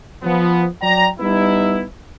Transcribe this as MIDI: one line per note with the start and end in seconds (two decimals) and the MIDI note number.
0.23 0.65 53
0.23 0.65 59
0.82 1.08 54
0.82 1.08 74
0.82 1.08 79
0.82 1.08 82
1.20 1.83 55
1.20 1.83 59
1.20 1.83 63
1.20 1.83 64